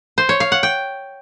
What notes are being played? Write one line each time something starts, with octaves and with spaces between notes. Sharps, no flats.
C5
C#5
F5
F#5
G5